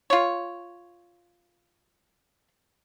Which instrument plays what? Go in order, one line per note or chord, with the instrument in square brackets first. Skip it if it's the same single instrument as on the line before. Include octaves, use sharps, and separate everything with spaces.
[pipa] F4 C#5